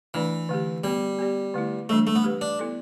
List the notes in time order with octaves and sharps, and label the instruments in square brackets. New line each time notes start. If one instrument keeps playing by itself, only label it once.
[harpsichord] E3 [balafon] A3 D4 B4 D5
[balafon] D3 A3 G4
[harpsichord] G3 [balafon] B3 G4 D5
[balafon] B3 G4 D5
D3 A3 E4
[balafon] E3 G3 D4 [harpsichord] A3
[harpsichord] A3
B3
[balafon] A3 G4 B4
[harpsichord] D4
[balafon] B3 E4 A4 D5